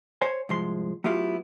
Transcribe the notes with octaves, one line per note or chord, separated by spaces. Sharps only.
C5 C#5 G#5
C2 G#2 F3 G#3 C6
F#3 A3 B3 E4 F4 G4